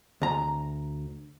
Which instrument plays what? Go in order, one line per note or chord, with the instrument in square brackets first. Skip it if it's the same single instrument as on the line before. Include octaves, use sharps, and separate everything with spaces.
[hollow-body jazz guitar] D2 A#5